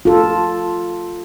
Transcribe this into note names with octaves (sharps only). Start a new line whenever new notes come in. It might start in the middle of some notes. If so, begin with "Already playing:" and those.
F4 A4